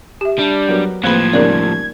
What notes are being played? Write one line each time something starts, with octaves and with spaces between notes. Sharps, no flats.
G4 E5
G3 D4
F#3 B3 F#4 A#4
A2 F3 A#3 C4 G#4 B4 B5 G#6
C#3 G3 D#4 A#4 D5